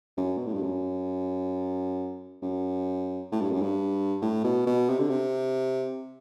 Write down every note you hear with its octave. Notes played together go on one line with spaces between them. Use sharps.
F#2
B2
A2
G2
F#2
F#2
A2
G2
F#2
G2
A2
B2
B2
C3
D3
C3